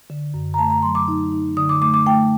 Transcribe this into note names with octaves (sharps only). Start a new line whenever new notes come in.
D3
F#2
A#5
A3 A5
A#5
F#3 C6
D6
D#4
D#4
D3 D#6
D6
A3 D6
D6
A3 G5